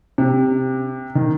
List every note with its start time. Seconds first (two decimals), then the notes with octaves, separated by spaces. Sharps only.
0.18 C3
1.15 D#3